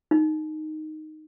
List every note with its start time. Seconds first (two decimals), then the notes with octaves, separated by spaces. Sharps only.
0.11 D#4